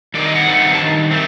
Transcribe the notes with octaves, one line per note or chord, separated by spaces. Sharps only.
G2 D#3 A3 C4 D5
D#5
F#5
G2 D#3 A3 C4
A5
G2 D#3
A3 C4